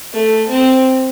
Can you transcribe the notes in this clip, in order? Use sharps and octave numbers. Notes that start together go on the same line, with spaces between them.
A3
C4